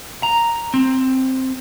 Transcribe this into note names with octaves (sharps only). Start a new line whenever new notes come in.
A#5
C4